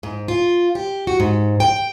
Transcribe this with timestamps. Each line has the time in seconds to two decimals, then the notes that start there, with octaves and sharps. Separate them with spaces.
0.03 G#2
0.28 F4
0.75 G4
1.07 F#4
1.20 G#2
1.60 G5